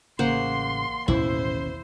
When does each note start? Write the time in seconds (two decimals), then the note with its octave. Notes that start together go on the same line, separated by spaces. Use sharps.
0.19 A1 C#3 A#3 C5 F#5 C6
1.08 A1 D#2 B2 C#4 E4 C5